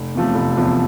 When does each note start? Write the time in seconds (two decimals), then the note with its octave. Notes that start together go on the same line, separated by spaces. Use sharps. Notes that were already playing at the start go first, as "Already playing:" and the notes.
Already playing: F1
0.14 E2 C3 F3 A3
0.35 F1
0.57 E2 C3 F3 A3